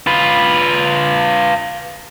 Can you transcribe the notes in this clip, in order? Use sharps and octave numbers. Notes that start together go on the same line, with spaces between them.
F4 B4